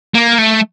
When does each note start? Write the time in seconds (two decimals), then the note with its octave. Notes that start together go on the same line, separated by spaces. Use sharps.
0.14 A#3
0.38 A3